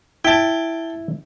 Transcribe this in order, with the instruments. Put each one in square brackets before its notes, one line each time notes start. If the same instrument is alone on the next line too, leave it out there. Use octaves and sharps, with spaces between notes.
[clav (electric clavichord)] E4 [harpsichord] G5 A5